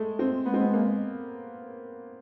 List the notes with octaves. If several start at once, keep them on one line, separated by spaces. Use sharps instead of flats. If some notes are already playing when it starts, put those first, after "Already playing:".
Already playing: G#3 A3
C4
G#3 B3
C4
B3
A#3